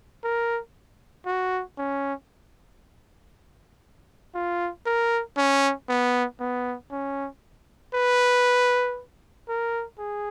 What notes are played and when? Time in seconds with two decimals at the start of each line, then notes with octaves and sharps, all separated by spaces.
0.24 A#4
1.26 F#4
1.78 C#4
4.34 F4
4.86 A#4
5.37 C#4
5.89 B3
6.40 B3
6.92 C#4
7.94 B4
9.48 A#4
9.99 G#4